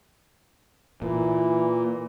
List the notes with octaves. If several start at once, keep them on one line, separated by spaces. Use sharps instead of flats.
A#2 E3